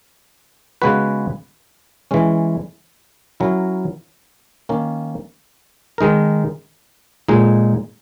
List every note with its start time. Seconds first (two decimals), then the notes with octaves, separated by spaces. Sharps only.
0.82 C#3 G#3 B3 F#4 B4
2.11 E3 G#3 C#4
3.40 F#3 C#4 E4 A#4
4.69 D#3 A#3 C#4
5.98 D#3 G#3 D#4 A#4
7.28 A#2 G#3 D#4